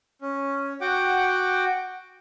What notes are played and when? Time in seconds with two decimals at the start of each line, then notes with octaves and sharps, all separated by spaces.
0.22 C#4
0.81 F#4 F#5 G5 D6